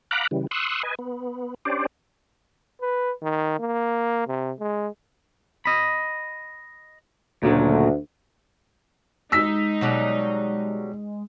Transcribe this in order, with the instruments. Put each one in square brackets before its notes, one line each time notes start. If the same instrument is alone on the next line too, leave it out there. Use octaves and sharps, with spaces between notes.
[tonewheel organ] F5 F#5 A#5 B5 D6 F#6
C#3 E3 G3
C6 C#6 D#6 E6 F#6
B4 D#5 G#5
B3
C#4 D4 G4 C5 D5
[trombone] B4
D#3
A#3
C3
G#3
[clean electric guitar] D#5 B5
[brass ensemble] D2 [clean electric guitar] A#2 C#3 F#3
[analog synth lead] G#3 [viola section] D#4 [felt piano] E6 B6
[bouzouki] B2 F#3 G3